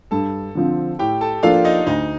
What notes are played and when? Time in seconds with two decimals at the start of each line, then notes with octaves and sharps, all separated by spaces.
0.11 G2 A4 A5
0.55 D3 F3 C4
0.99 A2 G4 G5
1.21 A4 A5
1.43 F3 A#3 D4 F4 A4 F5
1.65 D#4 D#5
1.87 D2 D#4 D#5